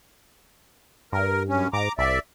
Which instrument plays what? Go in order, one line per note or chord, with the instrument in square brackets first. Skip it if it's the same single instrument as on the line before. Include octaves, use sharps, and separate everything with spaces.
[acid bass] G2 [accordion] A#4
[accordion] F#2 C#4
[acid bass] G#2 [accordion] A#5 D6
[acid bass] C2 [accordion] D5 E5